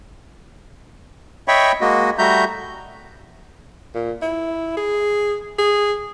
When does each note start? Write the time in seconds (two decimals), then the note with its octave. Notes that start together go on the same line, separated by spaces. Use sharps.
1.48 C#5 D#5 E5 G5 B5 C#6
1.81 G#3 A#3 F#4 D#5
2.18 G3 A3 F#4 E5 A#5 G6
3.95 A#2
4.22 E4
4.77 G#4
5.58 G#4